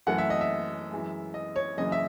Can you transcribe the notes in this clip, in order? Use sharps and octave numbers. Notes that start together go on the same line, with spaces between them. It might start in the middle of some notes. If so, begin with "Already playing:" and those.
F#2 E3 A3 F#5
E5
D#5
E5
F#2 E3 G#3
D#5
C#5
F#1 F#2 C#3 E3 D#5
E5